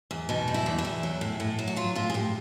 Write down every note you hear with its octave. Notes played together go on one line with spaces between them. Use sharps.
E2
B2 D#4
G3
E4
E2
E4
E2
F#3
A2
A2
F#3
F#4
F#3 F4
A2 F4
G#4
A2 G4